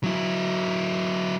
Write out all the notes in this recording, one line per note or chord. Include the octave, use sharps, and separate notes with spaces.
F#3 E4